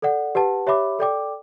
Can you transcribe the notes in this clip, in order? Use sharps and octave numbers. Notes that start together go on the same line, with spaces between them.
A4 D5 F#5
G4 B4 F#5 A5
G4 C#5 E5 B5 D6
A4 D5 G5 D6